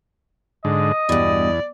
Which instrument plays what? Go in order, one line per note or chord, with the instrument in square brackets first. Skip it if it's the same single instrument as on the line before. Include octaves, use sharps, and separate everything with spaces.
[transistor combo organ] G#2 D3 [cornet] D#5
[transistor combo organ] E2 [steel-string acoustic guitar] G2 B2 [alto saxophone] D5